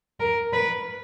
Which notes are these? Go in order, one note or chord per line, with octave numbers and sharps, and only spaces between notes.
A#4
B4